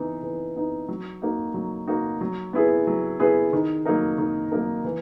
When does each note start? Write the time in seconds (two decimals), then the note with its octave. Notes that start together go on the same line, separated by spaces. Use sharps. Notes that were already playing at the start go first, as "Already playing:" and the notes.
Already playing: E3 B3 D#4
0.23 E3
0.56 B3 D#4
0.88 F#3
1.22 A#3 D#4 F#4
1.54 F#3
1.87 A#3 D#4 F#4
2.21 F#3
2.53 B3 E4 G#4 B4
2.87 F#3
3.20 B3 E4 G#4 B4
3.53 D#3
3.85 F#3 A#3 D#4 A#4
4.18 D#3
4.52 F#3 A#3 D#4 A#4
4.84 E3